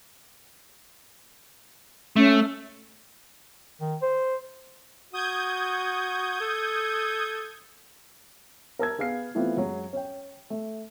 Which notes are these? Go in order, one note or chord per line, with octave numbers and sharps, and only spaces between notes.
A3 C#4
D#3
C5
F#4 D#6 G6 G#6
A4
A#4 A5 E6 G#6
B3 G#4 F5 F6 C7
E3 A3 B3 C4 F4
F#2 F#3 G#3
C#4 G5
A3